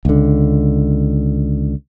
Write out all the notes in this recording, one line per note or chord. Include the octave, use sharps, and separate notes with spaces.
C#2 D3